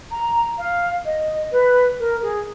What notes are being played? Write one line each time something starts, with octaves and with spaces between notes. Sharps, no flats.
A#5
F5
D#5
B4
A#4
G#4